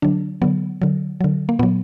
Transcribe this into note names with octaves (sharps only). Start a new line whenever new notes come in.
D3 F#3 D4
D3 F#3 B3
D3 F#3
D3 F#3
A#3
A#2 F#3 B3